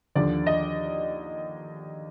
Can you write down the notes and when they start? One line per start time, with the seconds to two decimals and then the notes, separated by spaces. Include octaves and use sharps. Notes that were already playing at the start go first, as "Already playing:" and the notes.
0.15 D#2 D3 F3 D5
0.47 D#5